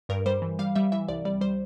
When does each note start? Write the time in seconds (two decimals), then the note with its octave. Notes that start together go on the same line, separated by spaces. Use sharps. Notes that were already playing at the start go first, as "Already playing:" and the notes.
0.09 G2 A#4
0.26 G3 C5
0.42 E3
0.59 G3 F5
0.76 G3 E5
0.92 E3 E5
1.08 C2 D5
1.25 G3 D5
1.41 G3 C5